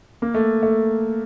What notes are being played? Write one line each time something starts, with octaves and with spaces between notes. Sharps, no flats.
A#3
A3
A3